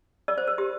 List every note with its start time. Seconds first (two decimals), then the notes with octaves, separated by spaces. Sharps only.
0.28 A#4 D5
0.38 C5
0.47 A#4
0.58 G4